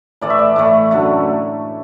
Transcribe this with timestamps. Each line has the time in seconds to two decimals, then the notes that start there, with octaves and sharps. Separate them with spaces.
0.21 A2 E3 A3 D5
0.30 E5
0.39 D5
0.56 A2 E3 A3
0.91 F#2 D3 A3